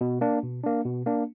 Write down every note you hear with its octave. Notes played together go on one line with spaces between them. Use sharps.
B2
A#3 D4
B2
A#3 D4
B2
A#3 D4